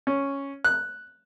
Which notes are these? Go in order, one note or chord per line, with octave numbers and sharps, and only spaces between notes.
C#4
F#6